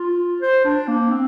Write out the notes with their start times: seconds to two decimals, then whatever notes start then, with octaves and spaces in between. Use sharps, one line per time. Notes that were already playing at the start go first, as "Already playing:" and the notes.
Already playing: F4
0.41 C5
0.64 D4
0.88 A#3
1.12 C4